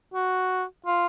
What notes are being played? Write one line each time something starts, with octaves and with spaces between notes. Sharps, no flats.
F#4
F4